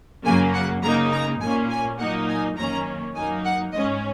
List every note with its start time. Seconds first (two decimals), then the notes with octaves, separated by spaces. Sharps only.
0.25 F#2 C#3 F#3 A#3 G#5
0.54 F#5
0.83 C#3 A#3 D#4 A#5
1.12 A#5
1.41 A#2 A#3 C#4 G#5
1.70 G#5
1.99 A#2 F#3 A#3 D#4 F#5
2.28 G#5
2.57 F#2 D#3 A#3 C#4 A#5
3.15 F#2 F#3 A#3 D#4 G#5
3.44 F#5
3.73 G#2 G#3 C#4 D#5